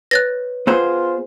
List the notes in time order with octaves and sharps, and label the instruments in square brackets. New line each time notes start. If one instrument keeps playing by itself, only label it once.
[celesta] B4 C#5 [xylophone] F#6 A6 A#6
[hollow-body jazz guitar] B3 G#4 C5 [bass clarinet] F4